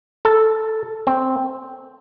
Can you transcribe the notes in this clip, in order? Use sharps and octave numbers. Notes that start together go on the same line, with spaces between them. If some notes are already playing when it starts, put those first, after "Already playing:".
A4
C4